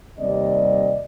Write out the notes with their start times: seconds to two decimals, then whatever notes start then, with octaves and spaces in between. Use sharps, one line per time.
0.19 D#2 C3 G3 D5 D#5